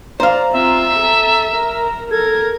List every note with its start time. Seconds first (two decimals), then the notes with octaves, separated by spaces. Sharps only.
0.20 C5 D5 F5 A#5
0.52 C4 F4 E5
1.00 A4
1.52 A#4
2.11 A4 A#4 G#6